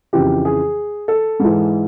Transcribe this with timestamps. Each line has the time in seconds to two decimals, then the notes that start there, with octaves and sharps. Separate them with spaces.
0.13 F2 C#3 E3 G4
0.45 G#4
1.08 A4
1.40 G#2 E3